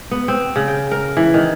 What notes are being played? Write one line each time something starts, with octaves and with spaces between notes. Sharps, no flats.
B3
C4
C#3
G5
A#4
E3
D#3